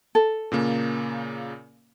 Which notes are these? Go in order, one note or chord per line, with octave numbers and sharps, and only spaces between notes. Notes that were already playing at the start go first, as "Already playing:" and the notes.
A4
A#2 C#3 A#3